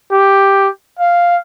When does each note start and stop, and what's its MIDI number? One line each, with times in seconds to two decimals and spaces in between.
0.11 0.67 67
0.99 1.37 77